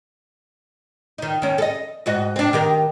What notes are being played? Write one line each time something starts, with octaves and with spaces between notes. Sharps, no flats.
D#3 D#4
D#3 C#4
A4 D#5
G#2 F#4 D#5
C4 D4
D#3 G4 A#4